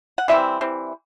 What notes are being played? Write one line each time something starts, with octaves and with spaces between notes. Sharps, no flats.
F#5
E3 G3 C4 E5
E3 G3 C4